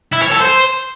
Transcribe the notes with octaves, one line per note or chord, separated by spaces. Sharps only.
E4
C#5
A4
C5